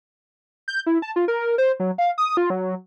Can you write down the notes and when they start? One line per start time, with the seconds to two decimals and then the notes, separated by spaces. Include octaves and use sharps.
0.68 G6
0.86 E4
1.02 A5
1.16 F4
1.28 A#4
1.58 C5
1.80 F#3
1.98 F5
2.18 D#6
2.37 F4
2.50 F#3